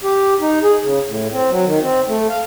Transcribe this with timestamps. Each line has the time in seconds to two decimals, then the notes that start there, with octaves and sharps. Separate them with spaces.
0.04 G4
0.41 D#4
0.63 G#4
0.84 C#3
1.07 A2
1.33 C4
1.50 F#3
1.65 D#3
1.82 C4
2.08 A3
2.29 F5